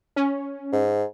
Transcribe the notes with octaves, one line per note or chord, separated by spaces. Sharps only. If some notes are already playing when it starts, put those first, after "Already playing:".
C#4
G#2